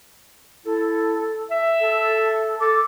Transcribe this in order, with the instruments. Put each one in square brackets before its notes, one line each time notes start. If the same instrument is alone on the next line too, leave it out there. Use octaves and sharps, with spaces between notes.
[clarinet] E4 [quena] A4
[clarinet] E5
[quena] A4
[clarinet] A4 [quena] D6